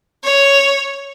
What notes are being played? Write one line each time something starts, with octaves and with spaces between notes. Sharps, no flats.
C#5